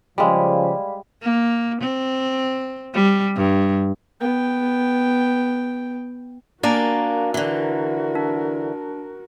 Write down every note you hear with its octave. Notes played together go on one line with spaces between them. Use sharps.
C#3 F3 G3 G#3 D5 F5 B5
A#3
C4
G3
G2
B3 G5
A#3 D4 F#4 A#4 D5 G#5 A#5
D3 E3
D4